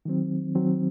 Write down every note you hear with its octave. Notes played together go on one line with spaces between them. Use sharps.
D#3 F#3 C4
D#3 F#3 C4